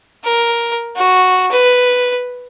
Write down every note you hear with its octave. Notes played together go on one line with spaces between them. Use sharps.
A#4
F#4
B4